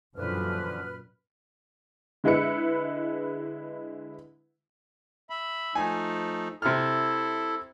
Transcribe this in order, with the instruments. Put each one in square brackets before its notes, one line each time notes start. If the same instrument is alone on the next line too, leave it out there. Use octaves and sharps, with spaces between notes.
[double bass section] F#2 A#2 [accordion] D3 E3 F3 [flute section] B4 F6
[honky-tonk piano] D3 G#3 E4 B4 C#7
[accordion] E5 B5
[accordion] F3 A3 D#4 [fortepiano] G#5
[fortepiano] C3 F6 [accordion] E4 A4